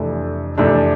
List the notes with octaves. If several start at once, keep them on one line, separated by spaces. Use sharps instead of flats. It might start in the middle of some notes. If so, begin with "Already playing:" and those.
Already playing: F2 C3 E3 A3 D4
F2 C3 E3 A3 D4